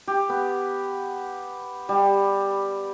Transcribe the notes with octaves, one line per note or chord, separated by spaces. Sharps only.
G4
B3
G3